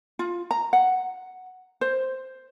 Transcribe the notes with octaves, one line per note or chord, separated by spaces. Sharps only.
F4
A#5
F#5
C5